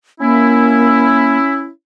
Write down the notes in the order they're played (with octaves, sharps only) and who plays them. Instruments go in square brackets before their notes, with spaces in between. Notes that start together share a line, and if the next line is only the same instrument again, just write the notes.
[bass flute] A#3 [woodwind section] C#4 E4